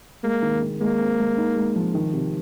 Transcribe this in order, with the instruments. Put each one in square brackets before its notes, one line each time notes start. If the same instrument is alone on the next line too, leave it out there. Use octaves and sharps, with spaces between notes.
[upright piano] G#3 [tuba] A#3
[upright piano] D#3
D#3
[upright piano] G#3 [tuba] A#3
[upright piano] C4
G#3
D#4
G#3
F3
D#3
C3